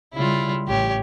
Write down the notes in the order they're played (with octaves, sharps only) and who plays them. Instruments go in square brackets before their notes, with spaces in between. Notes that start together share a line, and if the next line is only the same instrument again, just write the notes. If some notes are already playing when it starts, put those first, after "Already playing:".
[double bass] C#3 G3 [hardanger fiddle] E4 F4
[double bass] A1 [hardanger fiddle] G4 C#5